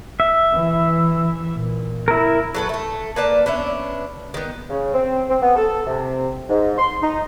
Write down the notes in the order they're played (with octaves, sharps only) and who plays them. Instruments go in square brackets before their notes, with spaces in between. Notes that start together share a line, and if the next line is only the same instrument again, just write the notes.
[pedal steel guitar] E5
[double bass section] E3
A#2
[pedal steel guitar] E4 A#4
[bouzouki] F#3 A4 B4
A3 A4
A#3 B4 D5 A5
B3 C#4 D4 E5
D#3 B3
[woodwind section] C#3
C4
C4
B3
A4
C3
G#2
C6
D#4